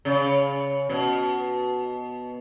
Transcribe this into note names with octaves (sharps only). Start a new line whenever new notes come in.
C#3
B2